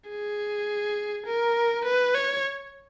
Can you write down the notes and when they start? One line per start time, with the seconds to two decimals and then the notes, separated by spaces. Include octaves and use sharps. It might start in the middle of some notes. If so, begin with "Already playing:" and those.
0.10 G#4
1.27 A#4
1.85 B4
2.14 C#5